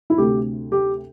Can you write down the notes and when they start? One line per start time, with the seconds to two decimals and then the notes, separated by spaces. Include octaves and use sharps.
0.10 E4
0.18 D2 C3 A3 G4
0.72 G4